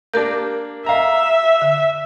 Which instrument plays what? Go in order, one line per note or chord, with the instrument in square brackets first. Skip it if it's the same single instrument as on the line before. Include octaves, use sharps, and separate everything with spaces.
[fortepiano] A#3 D4 [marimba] G4 A#4 G6
[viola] E5 [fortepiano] F5 A#5
[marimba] D3